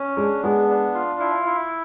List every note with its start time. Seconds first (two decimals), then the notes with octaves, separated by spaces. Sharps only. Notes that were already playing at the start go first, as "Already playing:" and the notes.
Already playing: C#4
0.17 G#3 D4
0.43 G#3 B3
0.69 D4
0.95 F4
1.20 E4
1.46 E4